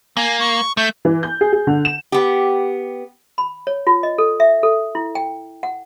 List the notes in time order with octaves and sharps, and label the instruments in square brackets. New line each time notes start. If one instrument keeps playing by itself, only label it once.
[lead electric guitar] A#3 [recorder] G#5
[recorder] C#6
[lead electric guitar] A3 [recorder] G6
[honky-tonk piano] E3
G6
G#4
G#4
D3
E7
[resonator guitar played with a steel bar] B3 G4
[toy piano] B5
C#5
F4
D#5
A4
E5
A4
E4
G5
F#5